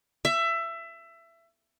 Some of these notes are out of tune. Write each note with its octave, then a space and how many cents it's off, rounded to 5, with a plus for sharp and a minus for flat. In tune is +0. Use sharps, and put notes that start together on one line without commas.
E5 +20